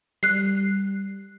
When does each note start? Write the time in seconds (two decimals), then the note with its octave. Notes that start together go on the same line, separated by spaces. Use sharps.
0.23 G3 F#6 C7